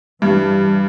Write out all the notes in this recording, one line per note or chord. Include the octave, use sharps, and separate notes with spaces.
G2 E3 G3